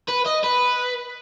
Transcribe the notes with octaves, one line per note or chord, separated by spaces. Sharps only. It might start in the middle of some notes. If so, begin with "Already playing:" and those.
B4
D#5
B4